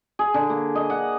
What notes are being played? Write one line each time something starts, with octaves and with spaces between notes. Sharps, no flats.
G#4
D3
A#3
D#5
F#5